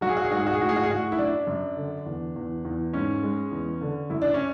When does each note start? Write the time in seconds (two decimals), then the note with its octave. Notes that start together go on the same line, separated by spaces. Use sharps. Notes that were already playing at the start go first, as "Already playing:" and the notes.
0.01 F#3 F#4
0.09 G#4
0.17 F#4
0.24 G#4
0.31 G#2 F#4
0.39 G#4
0.46 F#4
0.54 G#4
0.60 A2 F#4
0.69 G#4
0.76 F#4
0.84 G#4
0.89 A2 F#4
1.12 E4
1.18 F#2 D4
1.47 F#2
1.77 D3
2.06 E2
2.36 E2
2.65 E2
2.93 G#2 C#4
3.23 G#3
3.51 E2
3.81 D3
4.10 F#2 E4
4.22 D4
4.34 C#4